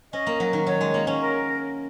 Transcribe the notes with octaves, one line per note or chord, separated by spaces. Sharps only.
C#4 D#5
A#3
F#3
D#3
F#3 C#5
G#3
A#3
C#4
A#4